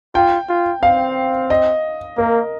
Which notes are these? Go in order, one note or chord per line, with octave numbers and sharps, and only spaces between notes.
F4 G5
F4
C4 F5
D#5
A#3 A#4